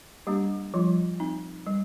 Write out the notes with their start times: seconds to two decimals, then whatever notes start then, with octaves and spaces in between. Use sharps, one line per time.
0.27 G3 A#3 D4 G4
0.74 F3 G3 F4
1.20 C4 D#4
1.67 G3